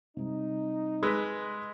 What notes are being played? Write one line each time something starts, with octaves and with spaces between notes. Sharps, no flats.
C3 G3 D#4
G#3 B4 E6 B6